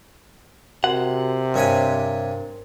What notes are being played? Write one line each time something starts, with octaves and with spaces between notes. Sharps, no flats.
C3 F#4 A#4 F#5
G2 D4 A#4 C5 C#5 G#5